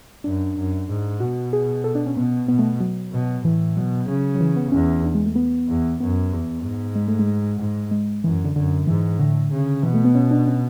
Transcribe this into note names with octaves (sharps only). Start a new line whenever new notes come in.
F#2 D4
F#2
G#2
B2 F#4
G#4
A4
D4
C#4
B2 B3
B2 B3
A3
F#3
B2
A2 E3
B2 F#3
C#3
F#3
E3
B3
E2 C#4
D4
G#3
A3
B3
E2
F#2 B3
E2
G#2
G#3
A3
G#3
G#2
G#3
F#2 E3
D3
F#2 D3
G#2 E3
A2 D3
C#3
B2 E3
A3
B3
C#4
D4
C#4